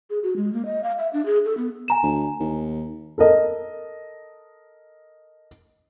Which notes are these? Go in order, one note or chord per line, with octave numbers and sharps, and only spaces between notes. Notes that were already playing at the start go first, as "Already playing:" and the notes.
G#4
F#4
G#3
A#3
D#5
F5
E5
D4
G#4
A4
B3
G#5 A#5 E7
D2
D#2
A4 A#4 D#5